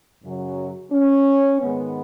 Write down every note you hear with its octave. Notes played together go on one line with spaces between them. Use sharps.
F#2 C#3 F#3
C#4
G#2 D#3 G#3 B3